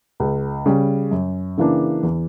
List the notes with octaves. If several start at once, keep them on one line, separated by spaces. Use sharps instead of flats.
C#2
C#3 G3
F#2
C#3 E3 A#3 D4
E2